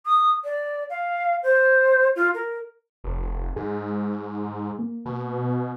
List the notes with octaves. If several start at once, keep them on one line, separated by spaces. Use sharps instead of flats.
D#6
D5
F5
C5
F4
A#4
F1
G#2 G#4
A#3
B2